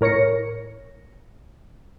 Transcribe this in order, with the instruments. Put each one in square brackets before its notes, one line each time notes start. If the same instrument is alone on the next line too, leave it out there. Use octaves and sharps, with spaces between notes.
[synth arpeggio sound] A2 A#4 C#5 A#6 C#7